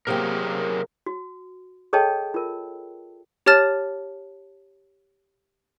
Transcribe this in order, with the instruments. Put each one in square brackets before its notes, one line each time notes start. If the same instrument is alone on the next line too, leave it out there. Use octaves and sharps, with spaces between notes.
[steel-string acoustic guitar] C3 A#3 G4 [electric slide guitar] F#3 G#4 A#4
[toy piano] F#4
G#4 A4 C#5 D#5 G5 A5
F4 A#4
[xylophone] G4 C#5 A5 F6 A6 E7